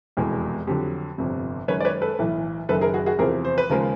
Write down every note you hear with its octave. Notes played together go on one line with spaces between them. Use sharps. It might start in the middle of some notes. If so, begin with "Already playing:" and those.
F1 E2 B2 G#3
F2 D3 F#3 G4
G1 F2 C3
F#2 D#3 G#3 B4 C#5
D5
B4 C#5
A4 B4
B1 A2 E3
F#1 F#2 D#3 A4 B4
G#4 A#4
F#4 G#4
F#4 G#4
E2 C3 F3 G#4 A#4
C5
B4
D#2 C#3 F3 G#3 A#4